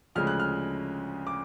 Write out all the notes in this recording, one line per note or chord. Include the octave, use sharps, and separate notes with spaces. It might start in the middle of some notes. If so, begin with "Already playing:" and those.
D2 C#3 F3 G#3 F6
F#6
F6
D6